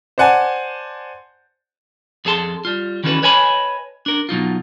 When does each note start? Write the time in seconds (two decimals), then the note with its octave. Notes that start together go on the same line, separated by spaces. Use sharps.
0.18 C5 D5 F#5 G#5 A5
2.25 F2 G#4 A4 A5 C6
2.65 G3 F4
3.04 D#3 E3 C#4 F#4 A4 B4
3.23 B4 C#5 D#5 G#5 A5 B5
4.06 D4 A#4
4.29 B2 F#3 D#4 F4